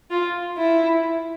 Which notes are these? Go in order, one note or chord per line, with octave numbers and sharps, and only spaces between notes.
F4
E4